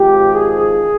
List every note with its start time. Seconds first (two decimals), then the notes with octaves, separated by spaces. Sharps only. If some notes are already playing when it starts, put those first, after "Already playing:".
Already playing: G#1 G#2 F3 G4
0.32 G#4